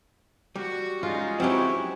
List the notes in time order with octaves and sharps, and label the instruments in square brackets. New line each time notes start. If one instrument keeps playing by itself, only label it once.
[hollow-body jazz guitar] G3 [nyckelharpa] F#4 C#6
[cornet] G#3 [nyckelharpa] C#4 D#4 [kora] F4
[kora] F#3 C#4 B4 [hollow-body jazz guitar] C4 G4 [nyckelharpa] E4